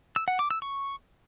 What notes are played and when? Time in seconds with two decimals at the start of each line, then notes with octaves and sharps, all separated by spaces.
0.16 E6
0.28 F#5
0.39 D6
0.51 E6
0.62 C#6